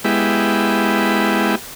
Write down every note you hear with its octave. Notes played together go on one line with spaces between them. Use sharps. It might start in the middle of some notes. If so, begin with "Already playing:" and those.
G#3 B3 E4 G4